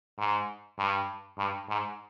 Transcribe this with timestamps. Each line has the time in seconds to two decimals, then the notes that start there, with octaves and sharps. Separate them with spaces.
0.18 G#2
0.78 G2
1.38 G2
1.69 G#2